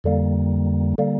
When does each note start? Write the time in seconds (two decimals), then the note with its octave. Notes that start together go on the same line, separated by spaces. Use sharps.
0.04 F2 D3 G3 A#3
0.98 D3 G3 A#3